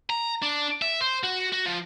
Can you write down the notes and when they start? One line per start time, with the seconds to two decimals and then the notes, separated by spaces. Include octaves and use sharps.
0.10 A#5
0.42 D4
0.82 E5
1.01 C5
1.24 F#4
1.52 F#4
1.66 F3